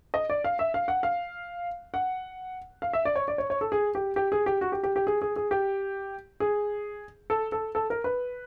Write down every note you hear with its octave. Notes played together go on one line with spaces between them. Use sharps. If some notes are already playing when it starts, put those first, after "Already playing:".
D#5
D5
F5
E5
F5
F#5
F5
F#5
F5
E5
D5
C#5
D5
C#5
C#5
A4
G#4
G4
G4
G#4
G4
F#4
G4
G4
G4
G#4
G#4
G#4
G4
G#4
A4
A4
A4
A#4
B4